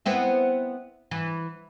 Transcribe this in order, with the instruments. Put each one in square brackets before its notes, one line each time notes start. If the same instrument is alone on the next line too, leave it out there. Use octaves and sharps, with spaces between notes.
[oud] B3 C4 E4
E3